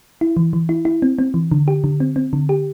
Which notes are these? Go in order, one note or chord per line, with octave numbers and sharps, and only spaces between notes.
E4
E3
E3
E4
E4
C4
C4
E3
D3
G4
D3
C4
C4
D3
G4